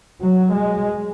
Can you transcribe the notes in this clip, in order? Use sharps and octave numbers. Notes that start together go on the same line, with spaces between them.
F#3
G#3